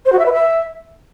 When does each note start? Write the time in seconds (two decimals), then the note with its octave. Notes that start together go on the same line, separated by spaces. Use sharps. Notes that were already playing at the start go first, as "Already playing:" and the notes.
0.06 C5
0.12 F#4
0.19 E5
0.26 B4
0.33 E5